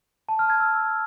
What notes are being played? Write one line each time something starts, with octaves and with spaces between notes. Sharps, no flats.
A5
F6
G#6
E6